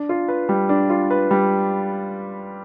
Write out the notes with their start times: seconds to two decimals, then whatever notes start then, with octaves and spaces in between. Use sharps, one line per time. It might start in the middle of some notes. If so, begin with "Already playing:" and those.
Already playing: D4
0.09 F4
0.28 B4
0.49 G3
0.69 D4
0.90 F4
1.10 B4
1.31 G3